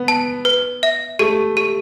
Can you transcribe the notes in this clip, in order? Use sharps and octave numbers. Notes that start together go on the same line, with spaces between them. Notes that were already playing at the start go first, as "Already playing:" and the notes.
Already playing: B3
A5
B4
E5
A3 G4
G4